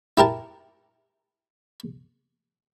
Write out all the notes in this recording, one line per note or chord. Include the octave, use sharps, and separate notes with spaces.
E4 G4 A#4 A5